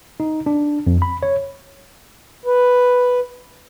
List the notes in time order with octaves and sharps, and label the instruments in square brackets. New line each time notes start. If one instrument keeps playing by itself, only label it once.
[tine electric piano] D#4
D4
F2
B5
C#5
[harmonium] B4